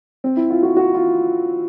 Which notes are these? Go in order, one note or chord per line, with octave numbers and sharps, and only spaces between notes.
C4
E4
F4
F#4
F#4
F4